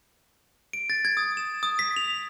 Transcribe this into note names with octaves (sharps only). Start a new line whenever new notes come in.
D7
A6
G#6
D#6
E7
D#6
B6
F7
F7